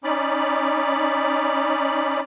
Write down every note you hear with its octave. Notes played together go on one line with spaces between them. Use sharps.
C#4 D#4 D5 B5